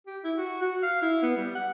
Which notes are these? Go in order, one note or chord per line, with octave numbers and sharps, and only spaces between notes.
G4
E4
F#4
F#4
F5
E4
B3
G3
F#5